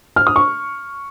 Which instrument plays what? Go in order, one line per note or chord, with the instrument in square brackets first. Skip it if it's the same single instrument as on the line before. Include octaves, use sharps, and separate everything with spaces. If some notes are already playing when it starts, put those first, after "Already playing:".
[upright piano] F6
D#6
C#6